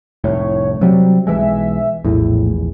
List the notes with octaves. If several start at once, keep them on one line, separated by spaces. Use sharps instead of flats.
F1 C2 A2 C#5
C3 F#3 G3
B1 E3 G#3 E5
A#1 E2 A2